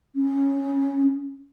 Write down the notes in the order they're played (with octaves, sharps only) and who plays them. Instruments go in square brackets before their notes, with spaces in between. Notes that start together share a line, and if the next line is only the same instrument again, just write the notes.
[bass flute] C#4